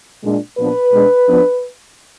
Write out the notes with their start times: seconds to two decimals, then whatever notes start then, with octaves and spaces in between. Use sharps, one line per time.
0.23 A#2 G#3 D4
0.57 A#2 F3 B3 D4 B4
0.93 B2 G#3 D4
1.27 F3 B3 D4